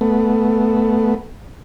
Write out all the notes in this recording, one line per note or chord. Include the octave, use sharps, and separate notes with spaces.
A3 B3